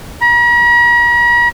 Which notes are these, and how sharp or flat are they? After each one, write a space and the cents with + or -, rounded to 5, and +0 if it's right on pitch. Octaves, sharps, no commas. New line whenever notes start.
A#5 +45